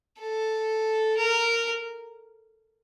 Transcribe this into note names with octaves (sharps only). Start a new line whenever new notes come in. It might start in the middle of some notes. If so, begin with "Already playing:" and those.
A4
A#4